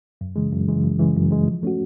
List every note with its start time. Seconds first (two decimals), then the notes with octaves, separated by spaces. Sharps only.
0.21 F#2
0.36 C#3 E3 G#3
0.52 F#2
0.68 C#3 E3 G#3
0.83 F#2
0.99 C#3 E3 G#3
1.16 F#2
1.31 C#3 E3 G#3
1.47 F3
1.63 A3 C#4 F#4